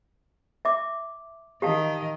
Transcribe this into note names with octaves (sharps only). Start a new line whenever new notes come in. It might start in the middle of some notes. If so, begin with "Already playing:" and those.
E5 D6
D#3 G4 D#5 F5 A5